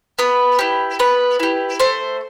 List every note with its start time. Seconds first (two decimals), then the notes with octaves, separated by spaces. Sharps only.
0.19 B3 B4
0.59 E4 G4
0.99 B3 B4
1.40 E4 G4
1.80 A3 C5